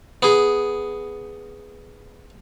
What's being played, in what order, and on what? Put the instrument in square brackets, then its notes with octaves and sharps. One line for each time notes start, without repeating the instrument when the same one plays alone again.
[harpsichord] B3 G#4